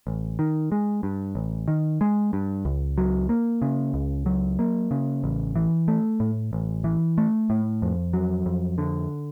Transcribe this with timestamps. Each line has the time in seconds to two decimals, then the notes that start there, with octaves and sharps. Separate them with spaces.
0.07 A1
0.39 D#3
0.72 G#3
1.03 G2
1.35 A1
1.68 D#3
2.01 G#3
2.33 G2
2.65 C#2
2.98 F#3
3.29 A#3
3.62 C#3
3.94 C#2
4.26 F#3
4.59 A#3
4.91 C#3
5.24 A1
5.56 E3
5.88 A3
6.20 A2
6.53 A1
6.84 E3
7.18 A3
7.50 A2
7.82 F2
8.13 F#3
8.46 F2
8.78 D3